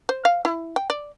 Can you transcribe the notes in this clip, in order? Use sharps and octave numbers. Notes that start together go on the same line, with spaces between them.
C5
F5
E4
G5
D5